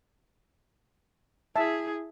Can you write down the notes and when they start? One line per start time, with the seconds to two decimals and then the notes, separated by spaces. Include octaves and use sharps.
1.56 E4 G#4 E5 A5